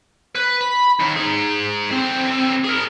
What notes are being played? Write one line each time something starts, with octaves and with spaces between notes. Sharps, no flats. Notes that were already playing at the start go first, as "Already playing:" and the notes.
B4
B5
D#2
D#4 G#4
D3 C4
G#4 A#4